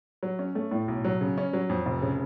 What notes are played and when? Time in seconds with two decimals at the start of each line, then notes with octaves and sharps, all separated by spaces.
0.23 F#3
0.39 C#4
0.55 A3
0.71 A2
0.88 B1
1.05 F#3
1.21 C#3
1.38 C#4
1.53 F#3
1.69 F2
1.86 F1
2.02 C#3